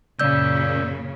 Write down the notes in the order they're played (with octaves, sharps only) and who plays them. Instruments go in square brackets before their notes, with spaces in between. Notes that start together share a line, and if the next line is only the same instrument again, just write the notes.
[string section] F#2 A#2 C#3 [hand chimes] D5 E6 G6